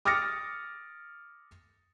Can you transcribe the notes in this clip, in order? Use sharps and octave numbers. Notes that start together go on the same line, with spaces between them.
D6 D#6 F6 A6 A#6 C#7